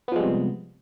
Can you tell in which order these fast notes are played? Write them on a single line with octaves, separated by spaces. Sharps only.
B3 F3 G#3 G3 C3